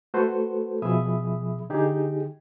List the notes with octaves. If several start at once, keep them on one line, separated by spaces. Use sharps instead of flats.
A3 F#4 A4 B4 C5
B2 F3 G#4 E5 B5 D#6
D3 D#4 G4 G#4